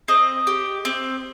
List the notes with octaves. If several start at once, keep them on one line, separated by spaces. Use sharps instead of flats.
C4 D#5
G4
C4